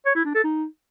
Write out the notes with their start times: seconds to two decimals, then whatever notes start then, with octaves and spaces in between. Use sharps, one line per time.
0.06 C#5
0.15 E4
0.25 D4
0.34 A4
0.44 D#4